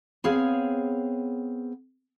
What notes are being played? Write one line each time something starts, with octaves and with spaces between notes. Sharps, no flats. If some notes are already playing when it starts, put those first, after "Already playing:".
B3 C4 G#4 C#5 F5